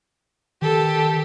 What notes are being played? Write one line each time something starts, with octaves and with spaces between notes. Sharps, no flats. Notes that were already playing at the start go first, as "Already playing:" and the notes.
D#3 G4 A4